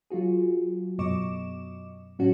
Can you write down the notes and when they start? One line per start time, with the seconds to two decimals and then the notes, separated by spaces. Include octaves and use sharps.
0.10 F#3 F4 F#4 G#4
0.99 F#2 B2 D#5 C#6 D6 E7
2.19 A2 F#3 C#4 D4 F#4